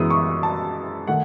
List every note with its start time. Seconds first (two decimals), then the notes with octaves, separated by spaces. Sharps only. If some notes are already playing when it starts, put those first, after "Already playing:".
Already playing: F#2 E3 G#3 B3 D#6
0.10 C#6
0.43 A5
1.07 D#3 A3 F#5